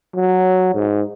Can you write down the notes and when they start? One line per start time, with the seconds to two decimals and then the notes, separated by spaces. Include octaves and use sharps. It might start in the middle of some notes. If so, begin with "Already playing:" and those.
0.16 F#3
0.75 G#2